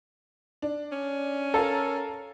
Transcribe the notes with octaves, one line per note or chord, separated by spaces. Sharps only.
D4
C#4
A4 A#4 F5 A#5